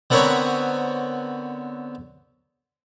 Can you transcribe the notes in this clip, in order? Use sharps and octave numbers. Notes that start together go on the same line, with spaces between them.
D3 B3 C4 A#4 B4 C#5